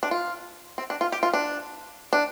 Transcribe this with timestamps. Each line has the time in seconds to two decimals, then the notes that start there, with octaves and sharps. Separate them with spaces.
0.03 D4
0.11 F4
0.78 C4
0.90 D4
1.01 F4
1.12 G4
1.23 F4
1.34 D4
2.13 D4